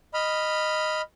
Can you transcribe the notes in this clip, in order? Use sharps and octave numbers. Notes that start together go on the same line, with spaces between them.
D#5 B5 F6